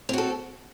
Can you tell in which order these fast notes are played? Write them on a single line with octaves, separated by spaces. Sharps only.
C4 F#4 A4